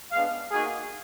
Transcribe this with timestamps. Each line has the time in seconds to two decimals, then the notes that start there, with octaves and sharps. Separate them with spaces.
0.11 G#3 B3 D4 F5
0.50 A#3 D#4 F#4 G#4